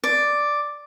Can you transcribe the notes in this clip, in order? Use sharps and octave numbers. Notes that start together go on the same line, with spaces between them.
D5